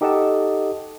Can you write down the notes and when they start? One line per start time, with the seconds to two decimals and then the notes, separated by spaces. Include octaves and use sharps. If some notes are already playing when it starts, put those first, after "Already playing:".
0.01 D#4 G4 A4 D#5 F#5 A5